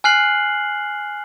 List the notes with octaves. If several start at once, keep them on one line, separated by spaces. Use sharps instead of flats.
G#5 F6 F#6 C7 F#7